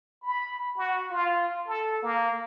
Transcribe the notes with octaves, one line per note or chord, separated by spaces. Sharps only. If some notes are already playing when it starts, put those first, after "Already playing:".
B5
F#4
F4
A4
A#3